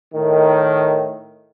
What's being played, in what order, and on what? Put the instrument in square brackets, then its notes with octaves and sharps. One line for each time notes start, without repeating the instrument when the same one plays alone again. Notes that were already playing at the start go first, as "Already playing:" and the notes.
[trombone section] A2 D#3